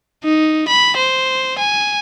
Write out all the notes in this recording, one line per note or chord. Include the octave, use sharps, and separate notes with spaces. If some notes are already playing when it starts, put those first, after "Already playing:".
D#4
B5
C5
G#5